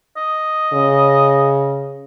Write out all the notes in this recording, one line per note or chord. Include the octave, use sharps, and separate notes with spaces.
D#5
C#3